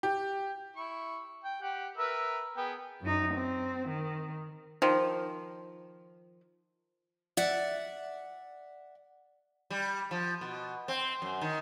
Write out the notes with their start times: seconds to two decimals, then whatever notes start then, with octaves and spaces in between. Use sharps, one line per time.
0.03 G4
0.76 E4 C#6
1.44 G5
1.62 G4 F#5
1.97 A#4 B4 E5
2.57 B3 G#4 G5
3.02 F#2 D#4
3.34 C4
3.89 D#3
4.82 D#3 F3
7.37 D5 E5 F#5
9.70 G3
10.11 F3
10.41 B2
10.88 C4
11.22 F#2
11.41 D#3